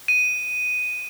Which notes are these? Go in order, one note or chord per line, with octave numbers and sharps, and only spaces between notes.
D#7